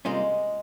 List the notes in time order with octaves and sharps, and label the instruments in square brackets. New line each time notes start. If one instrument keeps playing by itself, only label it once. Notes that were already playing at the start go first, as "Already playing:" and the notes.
[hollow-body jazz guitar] C3 G3 A#3 C#4 F4 [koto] G#3